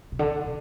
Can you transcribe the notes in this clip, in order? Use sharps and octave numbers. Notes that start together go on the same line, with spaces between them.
B2
D3
B2